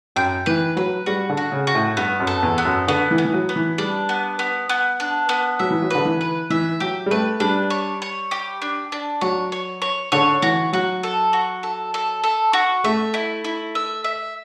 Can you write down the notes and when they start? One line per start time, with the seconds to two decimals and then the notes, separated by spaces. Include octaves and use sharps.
0.16 F#2 G5
0.46 E3 B4
0.76 F#3 B4
1.06 G3 F#4
1.29 D3
1.37 F#4
1.52 C#3
1.67 F#4
1.75 A2
1.97 G2 B3
2.20 F#2
2.27 A4
2.43 E2
2.58 B3
2.65 F#2
2.88 D3 B3
3.11 E3
3.18 B3
3.25 E3
3.33 F#3
3.49 B3
3.56 E3
3.78 G3 D4
4.09 B3
4.39 B3
4.69 B3
5.00 D4
5.29 B3
5.59 F#3 E5
5.71 E3
5.82 F#3
5.90 D3 B4
6.05 E3
6.21 B4
6.50 E3 E5
6.80 F#3 G4
7.06 G3
7.11 A3 B4
7.40 G3 D4
7.70 C#5
8.02 C#5
8.31 G4
8.62 D4
8.92 D4
9.21 F#3 C#5
9.52 C#5
9.82 C#5
10.12 D3 C#5
10.42 E3 F#4
10.73 F#3 F#4
11.03 A4
11.33 F#4
11.63 A4
11.94 A4
12.24 A4
12.53 F#4
12.84 A3 E5
13.14 E4
13.44 E4
13.75 E5
14.04 E5